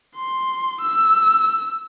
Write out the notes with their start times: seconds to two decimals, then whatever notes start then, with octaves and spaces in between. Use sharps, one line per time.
0.15 C6
0.82 E6